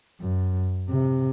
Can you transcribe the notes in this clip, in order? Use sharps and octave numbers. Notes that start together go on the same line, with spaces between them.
F#2
C3